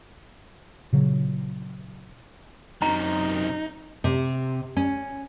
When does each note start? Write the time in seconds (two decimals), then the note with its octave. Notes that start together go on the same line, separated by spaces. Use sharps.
0.93 A#2 C#3 F#3
2.82 F#2 C3 D#3 D#4 A#5
4.04 C3
4.77 C#4